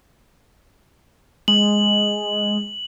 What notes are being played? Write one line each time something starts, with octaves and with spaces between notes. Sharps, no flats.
G#3 F#7